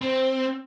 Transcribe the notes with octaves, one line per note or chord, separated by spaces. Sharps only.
C4